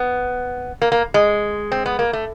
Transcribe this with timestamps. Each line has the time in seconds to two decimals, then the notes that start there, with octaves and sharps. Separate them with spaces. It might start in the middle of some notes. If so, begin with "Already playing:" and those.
Already playing: B3
0.82 A#3
0.92 A#3
1.14 G#3
1.72 C4
1.86 B3
1.99 A#3
2.13 A3